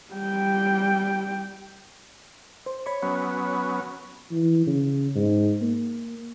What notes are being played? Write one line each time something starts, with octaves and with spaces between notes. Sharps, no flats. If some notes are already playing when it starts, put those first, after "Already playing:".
G3 G5
C5
C#5 B5 C#6
F#3 B3 C#4
E3
C#3
G#2
A#3